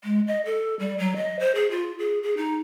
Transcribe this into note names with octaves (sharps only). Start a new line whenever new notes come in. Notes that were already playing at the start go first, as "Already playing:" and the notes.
G#3
D#5
A4
G3
F#3
D#5
C5
G#4
F4
G#4
G#4
D#4